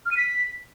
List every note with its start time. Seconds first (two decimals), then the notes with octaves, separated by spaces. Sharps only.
0.06 F6
0.11 D#7
0.17 B6